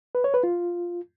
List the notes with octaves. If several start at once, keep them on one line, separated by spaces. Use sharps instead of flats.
B4
C#5
B4
F4